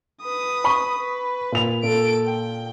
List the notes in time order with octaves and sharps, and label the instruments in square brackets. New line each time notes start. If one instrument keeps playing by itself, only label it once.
[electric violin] B4 D#6
[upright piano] B5 C#6
[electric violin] B4
[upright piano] A#2 F7
[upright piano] A#2 [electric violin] A4 D7
[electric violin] G5